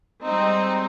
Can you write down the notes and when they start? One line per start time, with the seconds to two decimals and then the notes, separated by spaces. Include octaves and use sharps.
0.24 G3 G#3 C4 D#4